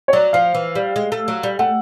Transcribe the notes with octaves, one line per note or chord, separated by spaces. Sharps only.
C#5
F#3 D5
F3 F5
E3
G3
G#3
A3
F#3
G3
A3 F#5